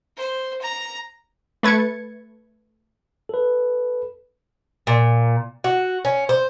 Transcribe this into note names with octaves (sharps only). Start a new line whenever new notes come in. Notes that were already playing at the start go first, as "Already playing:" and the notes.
C5
A#5
A3 B4 G#6 A6 C#7
A4 B4
A#2
F#4
C#4
C5